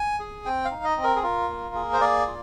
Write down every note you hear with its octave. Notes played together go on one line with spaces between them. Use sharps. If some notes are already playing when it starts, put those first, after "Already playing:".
Already playing: G#5
G#4
C4 G5
F5
D#4
D#5
C4
A#4
G#4
F4 A#4
A#3
G#4
C5
A#3 D5
F4